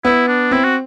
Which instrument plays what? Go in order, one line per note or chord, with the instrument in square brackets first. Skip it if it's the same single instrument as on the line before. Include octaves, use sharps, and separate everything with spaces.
[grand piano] B3 [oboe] E4
[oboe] D4
[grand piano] C4 [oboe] E4
[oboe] F#4